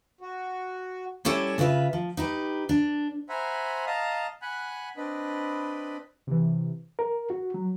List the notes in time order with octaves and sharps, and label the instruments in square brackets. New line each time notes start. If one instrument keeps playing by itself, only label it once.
[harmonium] F#4
[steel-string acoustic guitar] G3 C#4 E4 A4 C#5 D5
C#3 F4 B4 D5 E5
F3
D#4 G4 B4
D4
[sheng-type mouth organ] C5 E5 F#5 G#5 A#5 B5
D#5 F5 A5 A#5 D#6
F#5 G#5 B5 F#6
C4 D4 B4 D#5 B5
[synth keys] C3 E3
[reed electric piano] A#4
F#4
F#3